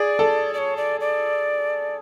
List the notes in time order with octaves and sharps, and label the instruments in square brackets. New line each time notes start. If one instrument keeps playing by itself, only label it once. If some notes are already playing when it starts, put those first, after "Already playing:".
Already playing: [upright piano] G#4 [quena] D5
[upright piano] A4
[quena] D5
C#5
D5
D5